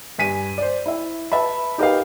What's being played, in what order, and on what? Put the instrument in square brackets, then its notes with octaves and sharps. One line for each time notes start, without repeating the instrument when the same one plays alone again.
[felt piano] G2 G#5 B6 D#7
C5 D5
E4 E5
B4 E5 A5 B5
D#4 G4 A#4 B4 D#5 F5